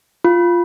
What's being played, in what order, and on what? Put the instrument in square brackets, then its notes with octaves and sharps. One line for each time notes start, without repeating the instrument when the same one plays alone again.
[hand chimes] F4